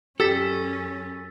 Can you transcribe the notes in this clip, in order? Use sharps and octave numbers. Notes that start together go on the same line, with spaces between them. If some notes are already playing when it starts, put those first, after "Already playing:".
F#2 C#4 G4 A4 E6 A6 B6